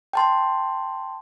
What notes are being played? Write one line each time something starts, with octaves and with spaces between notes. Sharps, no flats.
G5 A5 C6